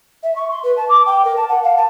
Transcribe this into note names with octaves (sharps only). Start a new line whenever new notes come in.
E5
C#6
C6
B4
A5
D6
G5
A#4
A5
F#5
F5
A5